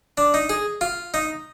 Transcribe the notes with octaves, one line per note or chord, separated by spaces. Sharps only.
D4
D#4
G#4
F4
D#4